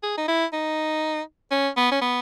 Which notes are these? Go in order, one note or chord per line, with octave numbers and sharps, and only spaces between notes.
G#4
D#4
E4
D#4
C#4
B3
C#4
B3